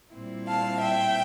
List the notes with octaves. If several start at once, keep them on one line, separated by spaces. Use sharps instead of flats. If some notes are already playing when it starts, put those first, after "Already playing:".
A#2 G3 C4 E4
F5 A5
E5 G5